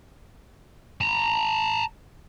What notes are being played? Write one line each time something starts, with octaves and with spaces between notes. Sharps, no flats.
A5 A#5